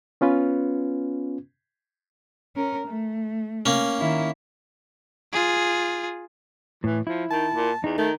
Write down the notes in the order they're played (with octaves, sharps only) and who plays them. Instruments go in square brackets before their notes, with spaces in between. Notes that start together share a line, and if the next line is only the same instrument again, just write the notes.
[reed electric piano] B3 C#4 F4 B4
[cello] C#4 A#4
A3
[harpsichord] A#3 C#4
[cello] D#3 E4
[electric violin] F4 G#4
[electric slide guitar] A2 [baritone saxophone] E3
[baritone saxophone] F3 [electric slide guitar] E4
[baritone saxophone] D#3 [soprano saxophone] A5
[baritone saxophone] A#2
[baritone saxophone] E2 [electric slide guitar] D#4
[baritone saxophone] D#3 [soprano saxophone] A3